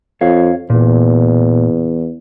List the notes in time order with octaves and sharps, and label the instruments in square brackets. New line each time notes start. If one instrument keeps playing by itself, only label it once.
[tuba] F2 [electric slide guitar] C#5 F5
[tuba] E2 [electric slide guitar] A#2